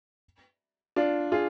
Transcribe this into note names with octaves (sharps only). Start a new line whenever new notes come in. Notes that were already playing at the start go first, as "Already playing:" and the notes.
D4 F4
F4 G#4